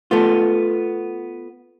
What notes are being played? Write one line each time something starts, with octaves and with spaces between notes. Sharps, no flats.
A3 B3 F4